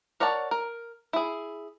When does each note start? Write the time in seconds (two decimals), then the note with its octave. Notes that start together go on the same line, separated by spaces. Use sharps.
0.20 A#4 C#5 D5 F#5 A5
0.51 A#4
1.13 E4 G#4